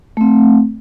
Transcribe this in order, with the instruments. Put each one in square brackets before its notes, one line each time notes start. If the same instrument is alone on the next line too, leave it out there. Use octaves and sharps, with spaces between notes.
[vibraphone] A3 C4